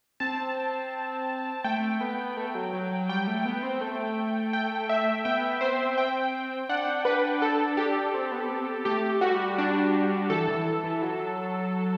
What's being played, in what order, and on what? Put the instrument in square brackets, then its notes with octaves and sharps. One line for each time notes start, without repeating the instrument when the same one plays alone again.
[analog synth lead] C4 [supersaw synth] A5
[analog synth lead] A3 [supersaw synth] G5
[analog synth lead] B3
A3
F#3
F#3
F#3
[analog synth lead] G3 [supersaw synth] G5
[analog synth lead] A3
B3
C4
A3
[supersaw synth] G5
E5
[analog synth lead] B3 [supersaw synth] G5
[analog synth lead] C4 [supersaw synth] C5
[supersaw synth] G5
[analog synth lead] D4 [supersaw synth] F#5
[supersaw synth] B4
A4
G4
[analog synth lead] C4
B3
C4
[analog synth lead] A3 [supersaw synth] G4
[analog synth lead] G3 [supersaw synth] F#4
[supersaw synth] D4
[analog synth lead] E3 [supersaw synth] A4
[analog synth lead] E3
E3
F#3